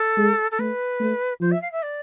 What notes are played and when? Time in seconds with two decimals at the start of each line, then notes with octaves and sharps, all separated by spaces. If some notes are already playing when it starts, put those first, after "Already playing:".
Already playing: A4
0.17 G#3
0.51 A4
0.59 A3 B4
1.00 A3
1.41 F3 C5
1.51 E5
1.61 F5
1.72 E5
1.82 D5